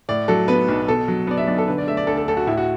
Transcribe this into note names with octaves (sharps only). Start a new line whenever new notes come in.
A2 D5
F#3 A4
B3 B4
B1
B2 A4
F#3
B3 D5
E5
B1 D5
A4
D3 B4
D5
A3 E5
D5
D2 A4
A4
D2 A4
F#4
A2 E4
F#4